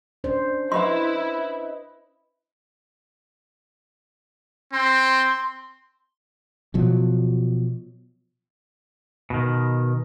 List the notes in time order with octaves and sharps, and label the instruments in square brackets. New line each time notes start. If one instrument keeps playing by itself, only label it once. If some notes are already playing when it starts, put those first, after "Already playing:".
[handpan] C#4 D4 C5
[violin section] E4 [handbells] B4 D#5 [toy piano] E5 B5 C6
[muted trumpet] C4 [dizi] C6
[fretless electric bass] B2 F3 F#3
[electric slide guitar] B2 D#3